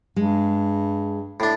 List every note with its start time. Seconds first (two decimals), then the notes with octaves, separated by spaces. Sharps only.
0.16 G2 G#3
1.40 A2 D4